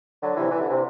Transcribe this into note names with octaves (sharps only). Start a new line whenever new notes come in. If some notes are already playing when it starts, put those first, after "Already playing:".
D3 F#3
C3 E3
E3
D3
C3